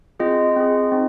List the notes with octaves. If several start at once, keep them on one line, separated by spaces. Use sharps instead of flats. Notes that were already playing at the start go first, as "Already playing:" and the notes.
C4 F4 G#4 D#5
C4 F4 G#4
C4 D#4